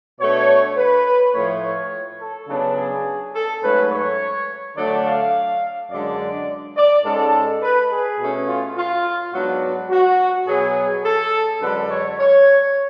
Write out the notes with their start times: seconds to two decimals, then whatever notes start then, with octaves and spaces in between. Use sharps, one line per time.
0.20 B2 A3 D4 C#5
0.78 B4
1.34 A2 F3 A3 C#5
1.63 C#5
2.21 A4
2.48 C#3 F#3 B3 D4
2.78 G#4
3.35 A4
3.63 G#2 F#3 A3 C#4 B4
3.91 C#5
4.77 D3 F#3 A3 D4 D5
5.06 F5
5.91 F#2 D3 G#3 D4 D5
6.77 D5
7.05 G#2 G#3 C#4 A4
7.62 B4
7.91 G#4
8.19 B2 A3 C#4
8.48 F4
8.77 F4
9.33 G#2 F#3 B3 D4 F#4
9.90 F#4
10.47 B2 F#3 B3 G#4
11.04 A4
11.61 F#2 D3 G#3 D4 B4
11.90 C#5
12.19 C#5